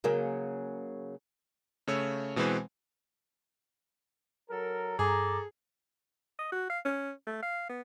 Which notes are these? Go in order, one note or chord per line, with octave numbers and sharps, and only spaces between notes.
C#3 F#3 A#3
C#3 A3 C#5 E6
B2 E3 G#3 C4 B4 C5
F#3 A4 A#4
G2 G#4 A4 A#5 D6
D#5
F#4
F5
C#4
A3
F5
B3